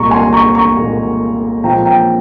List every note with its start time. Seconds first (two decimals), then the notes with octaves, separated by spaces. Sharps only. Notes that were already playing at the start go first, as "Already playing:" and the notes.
Already playing: C2 A#2 G#3 A#5 C#6
0.11 G#5 C6
0.33 A#5 C#6
0.55 A#5 C#6
0.76 C2 A#2 G#3
1.64 A#2 F3 G#3 C4 G5 A#5
1.85 G5 A#5